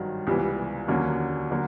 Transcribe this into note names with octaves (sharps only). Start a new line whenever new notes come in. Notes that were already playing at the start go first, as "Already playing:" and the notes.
Already playing: G#1 G2 D#3 F#3
C#2 C3 E3 G3 B3
D#2 D3 F#3 A#3 C#4
D3 F#3 A#3